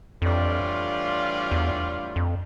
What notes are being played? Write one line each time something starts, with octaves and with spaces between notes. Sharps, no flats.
F2 A2 E3 G3 D4 F4
E2
F2